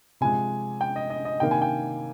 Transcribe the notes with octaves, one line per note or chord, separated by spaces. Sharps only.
C3 F3 G#3 G#5
G5
D#5
D#5
D#5
C3 D#3 A#3 G5
G#5
G5